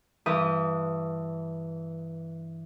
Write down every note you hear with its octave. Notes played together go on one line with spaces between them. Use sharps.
G2 E3 G4 B4 D#6